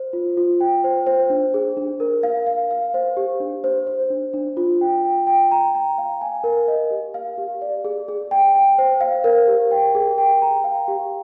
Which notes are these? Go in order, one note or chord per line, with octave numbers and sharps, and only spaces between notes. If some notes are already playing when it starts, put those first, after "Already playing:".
Already playing: C5
F4
F4
G5
C5
C5
D4
G#4
D4
A#4
F5
F5
F5
C5
G4
D4
C5
C5
D4
D4
F4
G5
G5
G5
A#5
A#5
F5
G#5
A#4
D#5
G4
F5
G4
D5
G#4
G#4
G5
G5
C5
F5
A#4
G4
G5
G#4
G5
A#5
F5
G4